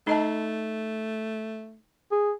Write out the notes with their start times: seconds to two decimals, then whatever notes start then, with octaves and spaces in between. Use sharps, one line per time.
0.07 A3 D#4 D#5 A5
2.11 G#4